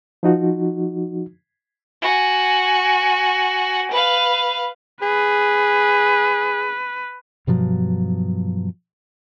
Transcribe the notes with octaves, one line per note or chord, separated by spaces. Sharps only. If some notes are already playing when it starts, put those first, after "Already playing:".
F3 D#4 F#4
F#4 G#5
B4 F5
G#4 B4
G2 B2 F3 F#3